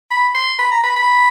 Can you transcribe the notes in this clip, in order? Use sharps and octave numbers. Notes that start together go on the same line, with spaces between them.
B5
C6
B5
A#5
B5
B5